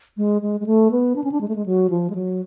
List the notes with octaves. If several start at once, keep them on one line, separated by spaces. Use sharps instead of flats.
G#3
G#3
G#3
A3
B3
D4
C#4
D4
G#3
A3
G#3
F#3
F3
G#3
F#3